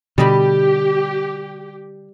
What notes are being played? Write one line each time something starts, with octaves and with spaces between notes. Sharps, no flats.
B2 D3 G3 G4 D#5 B5